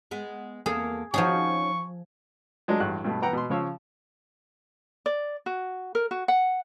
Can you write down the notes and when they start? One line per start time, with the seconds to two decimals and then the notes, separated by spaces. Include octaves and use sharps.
0.11 G#3 B3
0.66 E2 A#3 G#4 A4
1.14 F3 C#4 D#4 F#4 G#4 C#6
2.68 F#3 G#3 A3 D4
2.80 A1 G2 F#4 F#6
3.04 G2 B2 A3
3.22 E3 B3 F#5 G5 A#5
3.33 B2 C6
3.50 C#3 F3 C#5 F5 E6
5.06 D5
5.46 F#4
5.95 A#4
6.11 F#4
6.28 F#5